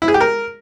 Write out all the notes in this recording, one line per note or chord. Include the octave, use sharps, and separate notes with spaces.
E4
G#4
G4
A#4